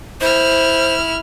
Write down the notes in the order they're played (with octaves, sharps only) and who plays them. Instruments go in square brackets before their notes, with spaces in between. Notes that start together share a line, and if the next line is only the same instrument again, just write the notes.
[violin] E4 F6 [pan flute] C5